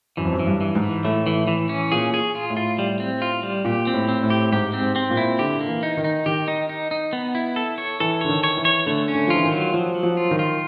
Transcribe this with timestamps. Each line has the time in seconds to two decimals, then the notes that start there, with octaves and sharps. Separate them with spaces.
0.17 F#2 E3
0.25 F2
0.33 F#2
0.39 E3
0.47 G2
0.61 E3
0.75 G#2
0.83 E3
1.04 A2 A3
1.27 E3
1.48 E3
1.69 C#4
1.91 A#2 G#4
2.14 G#4
2.35 F4
2.50 A2
2.57 F4
2.79 G3
3.00 C4
3.22 F4
3.43 G3
3.65 A#2 G4
3.87 C4
3.94 A2
4.09 C4
4.23 A2
4.30 G4
4.52 G#2 G4
4.73 C4
4.81 G#2
4.96 C4
5.10 A#2
5.17 E4
5.39 D3 G4
5.61 A#3
5.68 E3
5.83 D#4
5.97 D#3
6.04 D#4
6.26 D#3 G4
6.48 D#4
6.69 D#4
6.91 D#4
7.13 B3
7.35 E4
7.56 A4
7.78 C#5
8.00 E3 A4
8.21 D3 C#5
8.29 D#3
8.44 C#5
8.57 E3
8.65 C#5
8.86 D3 A3
9.08 C#4
9.15 D3
9.27 F3 F4
9.36 E3
9.45 D#3
9.52 F#3
9.73 F3 F#3
9.95 F#3
10.03 F3
10.17 F4
10.31 D#3
10.39 F4